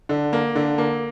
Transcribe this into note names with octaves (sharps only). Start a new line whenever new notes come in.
D3
A#3
D3
A#3